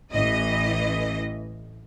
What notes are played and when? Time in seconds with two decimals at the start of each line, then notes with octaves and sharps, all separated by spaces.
0.12 A1 E3 D#5